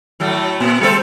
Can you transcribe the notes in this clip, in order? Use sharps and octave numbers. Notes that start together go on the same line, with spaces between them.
A2 F#3 A3
A#2
G3 A4 C5